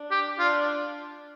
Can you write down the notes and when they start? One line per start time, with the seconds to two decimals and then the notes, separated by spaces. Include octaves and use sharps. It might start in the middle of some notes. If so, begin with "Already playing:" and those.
Already playing: D4
0.11 G4
0.39 D4 F4